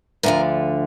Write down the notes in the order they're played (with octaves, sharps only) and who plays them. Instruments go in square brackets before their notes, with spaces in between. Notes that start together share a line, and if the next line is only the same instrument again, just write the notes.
[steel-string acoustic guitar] D2 D3 F3 A#4